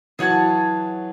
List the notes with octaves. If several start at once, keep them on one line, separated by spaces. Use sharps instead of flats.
E3 F#3 G#4 C#5 F#5 A5